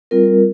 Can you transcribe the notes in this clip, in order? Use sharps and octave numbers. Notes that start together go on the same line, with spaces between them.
G3 C4 F4 A#4